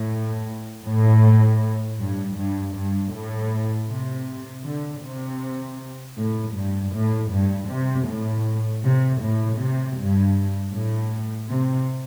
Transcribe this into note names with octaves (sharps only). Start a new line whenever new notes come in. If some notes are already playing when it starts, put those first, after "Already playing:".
Already playing: A2
A2
G2
G2
G2
A2
C3
D3
C3
A2
G2
A2
G2
C3
A2
C3
A2
C3
G2
A2
C3